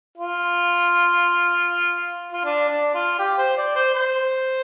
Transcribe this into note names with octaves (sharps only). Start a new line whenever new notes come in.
F4
F4
D4
D4
F4
G4
C5
D5
C5
C5